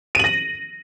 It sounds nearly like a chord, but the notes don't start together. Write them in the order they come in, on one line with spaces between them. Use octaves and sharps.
D#7 F#7 A#6